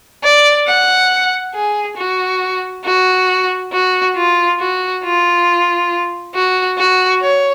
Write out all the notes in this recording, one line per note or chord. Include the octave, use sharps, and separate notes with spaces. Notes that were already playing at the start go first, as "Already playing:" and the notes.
D5
F#5
G#4
F#4
F#4
F#4
F4
F#4
F4
F#4
F#4
C#5